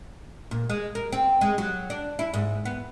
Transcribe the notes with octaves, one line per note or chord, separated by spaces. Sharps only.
A#2
G#3
A#4
C4
G#3
F#3
D4
E4
G#2
B3